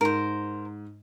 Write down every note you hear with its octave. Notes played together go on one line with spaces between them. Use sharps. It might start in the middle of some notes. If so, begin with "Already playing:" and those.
G#2 A#4 C5